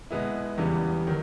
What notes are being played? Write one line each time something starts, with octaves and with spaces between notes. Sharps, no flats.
B2 G#3 B3 E4
E2 C#3 E3 G3 B3
D#3 F#3